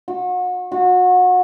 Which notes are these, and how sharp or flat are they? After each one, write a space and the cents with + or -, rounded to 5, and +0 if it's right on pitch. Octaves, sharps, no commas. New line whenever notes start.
F#4 -35
F#4 -30